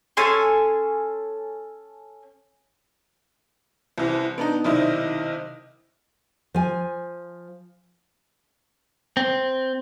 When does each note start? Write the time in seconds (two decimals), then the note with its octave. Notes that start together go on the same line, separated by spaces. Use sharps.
0.17 C#4 A4 G#5 C6
3.98 C2 C3 E3
4.38 B3 D4 D#4
4.64 B1 C3 D#3 E4 D5 D#5
6.54 F3 G#5
9.17 C4